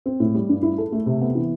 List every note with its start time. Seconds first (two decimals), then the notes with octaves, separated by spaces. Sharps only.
0.06 C4
0.20 A2
0.35 G3
0.49 G2
0.63 E4
0.78 A4
0.92 A3
1.06 C3
1.21 B3
1.35 E3